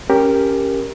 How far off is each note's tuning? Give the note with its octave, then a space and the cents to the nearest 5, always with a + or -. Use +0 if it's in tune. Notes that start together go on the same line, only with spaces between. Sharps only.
C#4 +0 G4 +10 A#4 +0